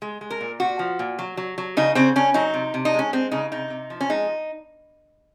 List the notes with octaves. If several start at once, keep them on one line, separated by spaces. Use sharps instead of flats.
G#3
G#3
A#4
A#2
A#2 F#4
F3
A#2
F#3
F#3
F#3
C#3 D#4
C#3 C4
C#3 C#4
F#3 D#4
C3
C3
D#4
G#3 C#4
G#3 C4
C#3 D#4
C3 D#4
C3
F3
C#4
G#3 D#4